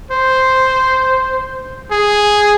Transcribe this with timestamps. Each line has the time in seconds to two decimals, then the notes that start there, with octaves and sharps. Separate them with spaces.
0.11 C5
1.91 G#4